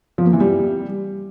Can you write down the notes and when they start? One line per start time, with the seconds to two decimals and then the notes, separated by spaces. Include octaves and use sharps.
0.18 F3
0.25 A#3
0.33 E3
0.40 G3